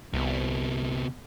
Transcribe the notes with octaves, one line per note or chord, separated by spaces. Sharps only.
C2 C3 B3